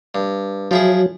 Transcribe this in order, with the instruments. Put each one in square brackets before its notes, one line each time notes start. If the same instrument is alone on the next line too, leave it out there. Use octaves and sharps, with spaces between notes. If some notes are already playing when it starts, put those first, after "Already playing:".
[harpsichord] G2
[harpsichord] F3 E4 G#4 [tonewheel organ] F#3